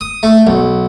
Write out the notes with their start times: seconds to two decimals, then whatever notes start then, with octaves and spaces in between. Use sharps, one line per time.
0.01 D#6
0.23 A3
0.47 B1